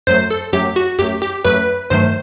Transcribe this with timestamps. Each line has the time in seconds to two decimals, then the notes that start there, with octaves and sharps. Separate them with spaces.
0.07 F#2 F#3 A3 C5
0.30 A4
0.53 F#2 F#3 A3 G4
0.76 F#4
0.99 F#2 F#3 A3 G4
1.22 G4
1.45 F#2 F#3 A3 B4
1.90 G2 D#3 F#3 A3 C5